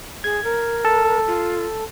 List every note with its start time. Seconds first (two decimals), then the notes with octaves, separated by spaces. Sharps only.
0.24 G#4 G#6
0.44 A#4
0.85 A4 A5
1.27 F4